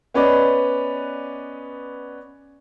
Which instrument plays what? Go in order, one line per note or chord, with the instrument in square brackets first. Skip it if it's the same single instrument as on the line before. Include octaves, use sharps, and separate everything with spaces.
[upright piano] B3 C#4 B4 D5 D#5